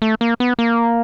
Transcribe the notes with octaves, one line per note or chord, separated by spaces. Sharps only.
A3
A#3
B3
A#3